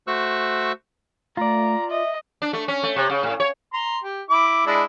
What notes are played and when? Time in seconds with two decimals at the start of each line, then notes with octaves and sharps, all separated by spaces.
0.07 A3 F#4 C5 C#6 E6 F#6
1.37 A3 F4 D5 A#5
1.91 D#5 E5
2.42 D4
2.53 A3
2.68 C#4
2.83 A3
2.96 C3
3.10 C#3
3.23 A2
3.40 C#5
3.74 A#5 C6
4.04 G4
4.30 E4 D6
4.66 G#3 D4 E4